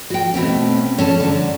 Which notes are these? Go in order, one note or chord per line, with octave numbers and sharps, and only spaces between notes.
F#4 G5
B2 A3 C4 C#4
C#4 A4 A5
D3 F#3